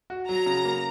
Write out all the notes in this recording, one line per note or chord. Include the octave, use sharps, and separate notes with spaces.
F#4
F#3 A#5
C#3
A#3